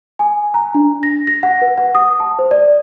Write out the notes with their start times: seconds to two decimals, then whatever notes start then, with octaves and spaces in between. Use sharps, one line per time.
0.19 G#5
0.54 A#5
0.75 D4
1.03 A#6
1.27 A#6
1.43 F#5
1.62 B4
1.78 F#5
1.95 D#6
2.20 A5
2.39 C5
2.51 D5